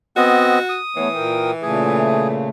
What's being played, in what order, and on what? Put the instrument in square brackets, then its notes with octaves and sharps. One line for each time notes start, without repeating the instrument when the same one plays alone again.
[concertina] B3 C4 D#5 [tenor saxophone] F#4
[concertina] D#6
[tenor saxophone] E3 [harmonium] A3 B3 C#5
[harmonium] A#2 A#4 G5
[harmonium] A#2 C#3 A3 [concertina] G#4